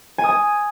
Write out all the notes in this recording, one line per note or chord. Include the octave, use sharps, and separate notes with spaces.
G#5
D#6
G#5